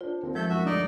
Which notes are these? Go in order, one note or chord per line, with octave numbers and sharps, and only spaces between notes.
D4 F4 C5
D#2 C4
F3 G#3 A3 A4 G6
F#2 E4 F#4 E5
D2 G2 G3 D#4 D5 D#5